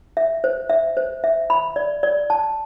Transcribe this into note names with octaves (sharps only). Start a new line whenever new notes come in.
E5
C5
E5
C5
E5
B5
D5
D5
A5